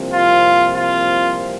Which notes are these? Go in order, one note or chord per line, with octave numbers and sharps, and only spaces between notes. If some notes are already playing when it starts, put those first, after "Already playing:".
Already playing: C2 C3 F3 A#3
F4
F4